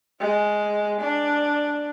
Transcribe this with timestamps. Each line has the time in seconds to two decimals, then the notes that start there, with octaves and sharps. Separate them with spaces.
0.20 G#3
1.01 D4